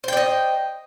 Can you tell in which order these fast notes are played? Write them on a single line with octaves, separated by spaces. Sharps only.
C5 G5 D5 D#5